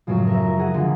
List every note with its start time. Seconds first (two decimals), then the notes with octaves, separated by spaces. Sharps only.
0.07 F#2 A2 C#3 F3
0.27 A#4 E5
0.58 F4 F#4 G#4 F#5
0.74 D3 F3 A#3